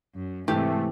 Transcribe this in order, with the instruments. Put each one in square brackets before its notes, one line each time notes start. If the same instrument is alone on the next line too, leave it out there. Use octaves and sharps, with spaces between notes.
[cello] F#2
[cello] G#2 C3 [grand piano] E3 [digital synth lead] A3 [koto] G4